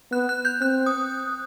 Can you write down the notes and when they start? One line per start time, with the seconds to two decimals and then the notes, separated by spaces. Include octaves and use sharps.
0.12 B3 F#6
0.29 F#6
0.45 G6
0.61 C4 F#6
0.86 D#6